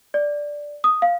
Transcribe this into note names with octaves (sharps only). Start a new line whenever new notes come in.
D5
D#6
F5